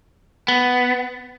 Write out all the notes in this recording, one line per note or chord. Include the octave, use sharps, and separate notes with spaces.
B3